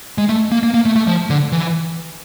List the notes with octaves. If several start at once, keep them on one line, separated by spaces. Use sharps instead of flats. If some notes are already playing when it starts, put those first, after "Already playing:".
G#3
A3
A#3
A#3
A#3
A3
A3
F3
D3
E3